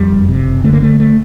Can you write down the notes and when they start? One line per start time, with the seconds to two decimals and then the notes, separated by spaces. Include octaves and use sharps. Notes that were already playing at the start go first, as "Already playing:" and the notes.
Already playing: F2 G3
0.12 F#1
0.29 C3
0.47 F#1
0.64 D3 A3
0.73 A#3
0.82 D3 A3
1.00 A3